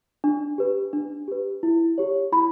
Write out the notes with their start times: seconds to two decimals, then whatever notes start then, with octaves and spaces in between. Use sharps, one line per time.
0.24 D4
0.58 G4 B4
0.93 D4
1.28 G4 B4
1.63 E4
1.98 G4 C#5
2.32 E4 B5